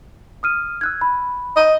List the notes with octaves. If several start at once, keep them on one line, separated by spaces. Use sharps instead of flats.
D#6 F6 D#7
E6 F#6 G#6
B5
D#5